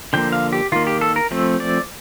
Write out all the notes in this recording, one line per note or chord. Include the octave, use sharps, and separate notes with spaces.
D3 F3 A#3 G5
F5
G4
D#3 A#3 F4
G4
A4
A#4
F3 A3 C4
D5